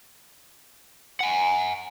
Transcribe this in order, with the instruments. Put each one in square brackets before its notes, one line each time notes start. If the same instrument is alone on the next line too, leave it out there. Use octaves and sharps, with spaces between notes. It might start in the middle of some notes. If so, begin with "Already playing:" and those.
[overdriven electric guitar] F#5 G#5